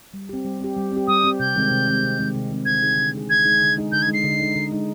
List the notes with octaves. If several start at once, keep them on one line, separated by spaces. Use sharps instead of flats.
G3
C4 G4
G3
C4 G4
G3
C4 G4
G3 D#6
C4 G4
C3 G6
D#3 G#3 C4
C3
D#3 G#3 C4
C3
D#3 G#3 C4
C3
D#3 G#3 C4
D3 G#6
G#3 D#4 G#4
D3
G#3 D#4 G#4
D3 G#6
G#3 D#4 G#4
D3
G#3 D#4 G#4
D3 G6
G#6
G#3 D#4
C7
D3
G#3 D#4
D3
G#3 D#4